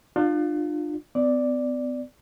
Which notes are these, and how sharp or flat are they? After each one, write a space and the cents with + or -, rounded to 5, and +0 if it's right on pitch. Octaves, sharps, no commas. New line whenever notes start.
D4 +45 F4 +15
B3 +45 D5 +0